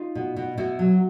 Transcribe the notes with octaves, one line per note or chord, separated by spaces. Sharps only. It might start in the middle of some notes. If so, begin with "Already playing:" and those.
Already playing: D#4 F4
B2
B2
B2 E4 F#4
F#3